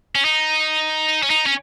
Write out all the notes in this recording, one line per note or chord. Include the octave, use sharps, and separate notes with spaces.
C#4
D#4
C#4
D#4
C#4